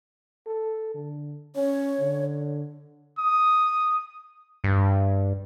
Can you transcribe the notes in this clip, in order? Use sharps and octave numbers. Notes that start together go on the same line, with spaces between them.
A4
D3
C#4 C#5
D3
D#6
G2